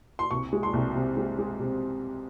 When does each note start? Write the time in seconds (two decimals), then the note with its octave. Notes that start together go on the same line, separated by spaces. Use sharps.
0.19 C6
0.31 C2 C#6
0.53 G#3
0.63 C6
0.73 C2
0.95 C3
1.17 G#3
1.38 G#3
1.59 C3